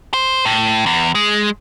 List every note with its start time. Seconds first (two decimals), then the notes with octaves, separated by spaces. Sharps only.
0.14 C5
0.45 A2
0.86 E2
1.15 G#3